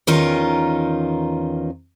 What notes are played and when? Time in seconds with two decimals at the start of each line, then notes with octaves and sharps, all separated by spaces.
0.07 E2 D#3 C#4 D#4 F4 A#4